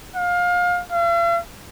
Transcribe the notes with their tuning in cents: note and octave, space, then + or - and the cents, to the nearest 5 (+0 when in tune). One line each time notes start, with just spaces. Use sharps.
F5 +25
F5 -45